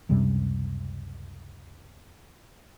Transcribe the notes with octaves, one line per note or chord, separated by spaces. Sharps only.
C#2 F#2 C3 G3